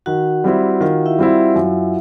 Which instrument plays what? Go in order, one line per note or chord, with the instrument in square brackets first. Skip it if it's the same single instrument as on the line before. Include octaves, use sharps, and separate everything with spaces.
[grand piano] D#3 [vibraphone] F#4 F#5
[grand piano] G3 C4 E4
[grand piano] D#3 [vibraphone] F4 F5
[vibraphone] E4 E5
[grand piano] G3 C4 E4
F#2